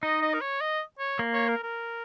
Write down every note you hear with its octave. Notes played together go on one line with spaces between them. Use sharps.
D#4 D#5
D#5
A#4
C#5
D#5
C#5
A#3
C#5
A#4
A#4